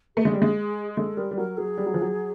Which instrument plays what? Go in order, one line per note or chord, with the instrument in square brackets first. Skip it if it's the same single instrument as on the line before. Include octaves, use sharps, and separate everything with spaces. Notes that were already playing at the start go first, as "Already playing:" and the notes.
[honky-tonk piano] A3 [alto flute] G#4
[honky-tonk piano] G#3
G3
G#3
[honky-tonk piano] G#3 [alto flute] A4
[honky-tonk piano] G3 [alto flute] A#4
[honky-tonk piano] G3
[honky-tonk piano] F#3 [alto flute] A#4
[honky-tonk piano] F#3 [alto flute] G#4
[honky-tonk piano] G3
F#3
F3
F#3